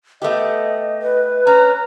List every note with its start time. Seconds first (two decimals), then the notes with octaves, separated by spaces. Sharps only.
0.22 A3 B3 G4 D#5
1.02 B4
1.47 C#4 A#5